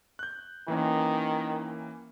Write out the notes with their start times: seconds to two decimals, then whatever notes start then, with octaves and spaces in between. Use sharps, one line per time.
0.19 F#6 G6
0.68 D#3 E3 A#3 C#4